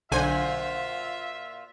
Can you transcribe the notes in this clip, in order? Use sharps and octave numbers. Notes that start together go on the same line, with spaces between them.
B1 A#2 D3 F4 F#4 C5 E5 G#5